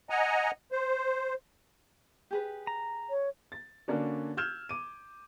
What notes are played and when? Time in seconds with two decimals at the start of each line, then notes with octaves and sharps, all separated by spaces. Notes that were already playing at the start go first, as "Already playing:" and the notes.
0.10 D#5 F#5 G#5 A#5
0.72 C5
2.31 G4 G#4 B4
2.67 A#5
3.10 C#5
3.52 A6
3.88 D3 A#3 C#4 D4 F#4
4.37 E6 F6 G6 G#6 E7
4.69 D6 D#7